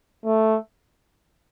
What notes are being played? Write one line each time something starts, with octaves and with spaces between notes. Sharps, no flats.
A3